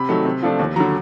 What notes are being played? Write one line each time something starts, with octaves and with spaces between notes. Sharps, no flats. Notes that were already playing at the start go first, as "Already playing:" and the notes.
Already playing: C3 B5
D#3 F#3 A3
C3
F3 A3 D4
D#2
D3 F#3 A#5